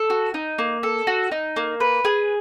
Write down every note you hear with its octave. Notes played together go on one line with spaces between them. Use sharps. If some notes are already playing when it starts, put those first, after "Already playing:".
Already playing: A4
F#4
D#4
A#3
A4
F#4
D#4
A#3
B4
G#4